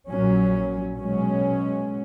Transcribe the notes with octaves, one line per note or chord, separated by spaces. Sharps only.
A#1 A#2 F#3 C#4
B2 F#3 G#3 C#4